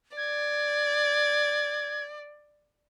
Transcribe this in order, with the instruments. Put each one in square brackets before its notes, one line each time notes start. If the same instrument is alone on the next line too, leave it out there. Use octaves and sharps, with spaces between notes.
[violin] D5 [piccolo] G#6